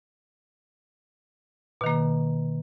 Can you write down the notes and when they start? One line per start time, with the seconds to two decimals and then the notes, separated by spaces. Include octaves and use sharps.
1.81 B2
1.84 D#3
1.86 A#3